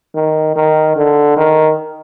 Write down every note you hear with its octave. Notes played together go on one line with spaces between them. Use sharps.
D#3
D#3
D3
D#3